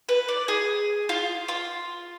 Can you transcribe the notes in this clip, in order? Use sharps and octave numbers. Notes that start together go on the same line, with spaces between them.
B4
D5
G#4
F4
F4